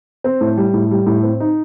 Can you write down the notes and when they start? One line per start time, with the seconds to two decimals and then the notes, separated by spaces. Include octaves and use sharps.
0.24 C4
0.41 A2
0.58 G3
0.74 A2
0.91 G3
1.06 A2
1.23 C4
1.40 D#4